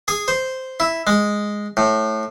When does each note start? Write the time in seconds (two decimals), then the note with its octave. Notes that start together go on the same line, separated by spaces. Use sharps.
0.08 G#4
0.28 C5
0.80 E4
1.07 G#3
1.77 A2